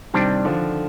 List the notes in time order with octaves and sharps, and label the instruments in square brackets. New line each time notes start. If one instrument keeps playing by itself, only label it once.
[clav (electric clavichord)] C3 G3 D4 [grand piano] D#3
[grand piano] D3 F3